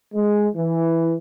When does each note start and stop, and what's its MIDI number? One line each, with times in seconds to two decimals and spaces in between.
0.14 0.48 56
0.56 1.15 52